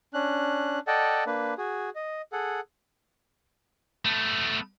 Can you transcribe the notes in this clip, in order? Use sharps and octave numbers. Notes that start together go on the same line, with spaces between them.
C#4 D4 F#6
A4 D5 D#5 F#5 G5 A5
A#3 D4 B4
F#4 G#4
D#5
G#4 A4 F#5
A3 B3